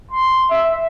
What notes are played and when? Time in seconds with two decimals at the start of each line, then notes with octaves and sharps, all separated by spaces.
0.11 C6
0.50 E5